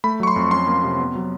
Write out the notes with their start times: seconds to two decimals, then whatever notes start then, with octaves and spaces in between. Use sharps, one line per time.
0.04 A3 B5
0.20 F#3 C#6
0.27 C6
0.36 F2
0.51 C#4 C6
0.67 A#3
0.84 C3
0.99 B3
1.15 F#3